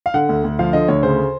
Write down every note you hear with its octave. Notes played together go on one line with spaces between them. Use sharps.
F5
D3 F#5
D2
D2
F3 F5
D3 D#5
D2 C#5
C#3 C5